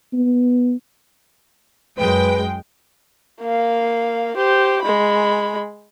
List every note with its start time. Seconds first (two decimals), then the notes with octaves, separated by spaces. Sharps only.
0.13 B3
1.98 F#2 G#3 B4 G5
3.41 A#3 F5
4.36 G4 C5
4.83 G#3 B5